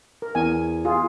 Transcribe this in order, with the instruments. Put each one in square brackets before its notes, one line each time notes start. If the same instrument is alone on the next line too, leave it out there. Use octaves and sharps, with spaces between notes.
[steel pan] A#4
[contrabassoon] E2 [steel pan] G#5
[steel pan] F4 G#4